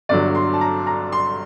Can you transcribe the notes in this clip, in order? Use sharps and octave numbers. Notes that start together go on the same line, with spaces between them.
G1 G2 D3 F#3 D5
C6
A5
A#5
A#5
C6